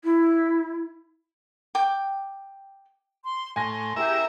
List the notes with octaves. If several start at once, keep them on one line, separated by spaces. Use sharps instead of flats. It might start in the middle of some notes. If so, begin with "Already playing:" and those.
E4
G5 D6
C6
A2 G#5 C6 A#6
E4 G4 G#4 A#4 E5